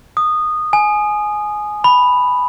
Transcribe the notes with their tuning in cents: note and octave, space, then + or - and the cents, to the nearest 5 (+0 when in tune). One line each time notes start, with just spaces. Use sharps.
D#6 -15
G#5 +15
B5 +0